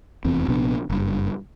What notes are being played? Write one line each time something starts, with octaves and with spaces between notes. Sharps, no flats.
F1 E2 C4
A#1 C3 B3 D4
F#1 G2